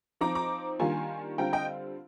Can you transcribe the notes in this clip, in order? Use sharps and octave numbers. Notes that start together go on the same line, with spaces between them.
F3 C4 D#4 A#5 D6
A#5 D6
D#3 G3 A#3 D4 F4 G#5 C6
D3 G3 C4 F4 G5 A#5
D#5 G5